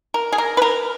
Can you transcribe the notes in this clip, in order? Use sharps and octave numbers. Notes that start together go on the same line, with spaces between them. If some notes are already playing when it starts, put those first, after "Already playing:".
A#4
G#4
A#4
B4
A#4